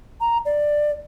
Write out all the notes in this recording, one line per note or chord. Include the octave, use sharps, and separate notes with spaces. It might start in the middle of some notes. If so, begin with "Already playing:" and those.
A#5
D5